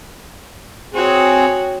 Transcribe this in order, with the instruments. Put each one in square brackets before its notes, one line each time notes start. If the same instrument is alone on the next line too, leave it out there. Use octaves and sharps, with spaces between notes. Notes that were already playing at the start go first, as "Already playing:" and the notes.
[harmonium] C4 G#4 [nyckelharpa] F#4 C#5